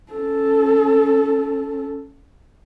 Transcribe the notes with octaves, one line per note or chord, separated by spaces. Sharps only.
C#4 A4